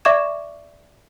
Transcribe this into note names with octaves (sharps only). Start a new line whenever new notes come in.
D5 E5 C#6 D6 G#6 E7